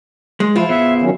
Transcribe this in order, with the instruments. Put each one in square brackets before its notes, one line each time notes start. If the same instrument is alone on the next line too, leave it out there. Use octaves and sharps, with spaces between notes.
[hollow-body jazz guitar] G#3
[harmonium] F3 [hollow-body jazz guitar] E4 F4
[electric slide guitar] B3 G#4 C5 [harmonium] E5
[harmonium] D#3 F#3 C#4